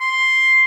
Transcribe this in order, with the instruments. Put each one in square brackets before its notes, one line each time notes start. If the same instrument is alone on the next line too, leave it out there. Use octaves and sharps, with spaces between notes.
[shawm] C6